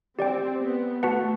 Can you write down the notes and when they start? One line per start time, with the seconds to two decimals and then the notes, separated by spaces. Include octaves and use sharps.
0.18 C4 G4 D5 G5
0.61 B3
1.03 A3 F#4 B4 F#5 A5